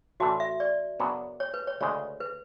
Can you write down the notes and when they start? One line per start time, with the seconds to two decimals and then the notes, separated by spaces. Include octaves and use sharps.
0.20 A2 E3 A3 D4 F#4 A4
0.40 E5
0.60 D5
1.00 F#2 C#3 F#3 B3 D4
1.40 C#5
1.54 B4
1.67 C#5
1.80 D2 C#3 G#3 C#5
2.20 B4